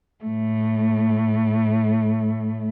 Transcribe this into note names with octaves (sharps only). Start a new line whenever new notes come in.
A2 A3